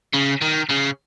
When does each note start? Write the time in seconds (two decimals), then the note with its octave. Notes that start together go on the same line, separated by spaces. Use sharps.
0.13 C#3
0.41 D#3
0.69 C#3